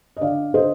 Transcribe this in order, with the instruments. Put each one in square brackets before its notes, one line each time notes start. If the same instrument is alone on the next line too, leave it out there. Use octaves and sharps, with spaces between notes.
[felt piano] D#5
D3 D5 F5
D3 C5 D#5